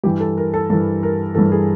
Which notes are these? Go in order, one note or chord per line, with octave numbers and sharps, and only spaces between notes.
G2 E3 G4
A4
A#4
A4
G2 E3 A4
A#4
G2 E3 A4
G#4